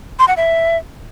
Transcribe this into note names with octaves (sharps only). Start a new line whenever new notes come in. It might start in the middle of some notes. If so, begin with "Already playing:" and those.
C6
F#5
E5